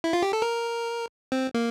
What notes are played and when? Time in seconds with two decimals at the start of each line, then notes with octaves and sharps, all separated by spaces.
0.04 E4
0.13 F4
0.23 G4
0.33 A4
0.42 A#4
1.32 C4
1.54 A#3